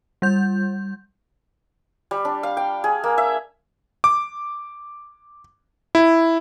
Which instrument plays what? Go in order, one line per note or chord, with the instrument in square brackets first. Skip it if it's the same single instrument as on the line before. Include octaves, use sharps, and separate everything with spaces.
[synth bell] G3 G6
[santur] G3
D4
F5
G5
G#4
A#3
E5
[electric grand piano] D6
E4